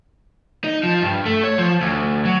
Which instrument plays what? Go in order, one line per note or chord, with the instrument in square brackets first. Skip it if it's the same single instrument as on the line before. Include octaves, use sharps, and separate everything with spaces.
[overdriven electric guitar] D#4
F3
G2
A3
C#5
F3
D2
F#3